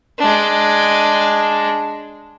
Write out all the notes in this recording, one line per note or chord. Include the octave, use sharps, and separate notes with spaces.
G#3 D4